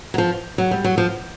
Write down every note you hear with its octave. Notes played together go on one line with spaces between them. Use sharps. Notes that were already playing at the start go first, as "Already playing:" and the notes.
F#3
F3
F#3
G3
F#3
F3